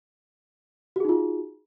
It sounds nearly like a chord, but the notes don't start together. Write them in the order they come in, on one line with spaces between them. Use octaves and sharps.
F#4 G#4 D#4 F4